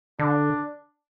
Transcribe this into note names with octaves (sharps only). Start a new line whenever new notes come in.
D3 D4